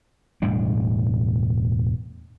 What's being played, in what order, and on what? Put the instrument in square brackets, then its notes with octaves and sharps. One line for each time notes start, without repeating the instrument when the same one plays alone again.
[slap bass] E1 A2 G3 D4